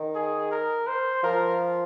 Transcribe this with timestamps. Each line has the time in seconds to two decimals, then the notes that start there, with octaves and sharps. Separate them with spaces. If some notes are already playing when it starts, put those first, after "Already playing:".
Already playing: D#3
0.15 G#4
0.51 A#4
0.87 C5
1.23 F3 A#4